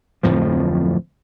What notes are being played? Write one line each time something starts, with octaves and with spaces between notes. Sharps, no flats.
D1 F2 A2 F3